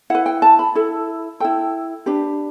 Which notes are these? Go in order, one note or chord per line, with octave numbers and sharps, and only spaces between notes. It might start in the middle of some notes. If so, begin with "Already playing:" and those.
E4 B4 F#5
G5
A5
B5
E4 A4
E4 A4 G5
D4 G4 B4